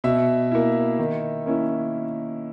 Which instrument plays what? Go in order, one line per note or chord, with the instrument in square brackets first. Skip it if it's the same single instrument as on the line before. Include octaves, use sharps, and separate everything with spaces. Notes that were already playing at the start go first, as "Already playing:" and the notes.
[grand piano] B2 E5
A#3 E4
D#3
A#3 C#4 E4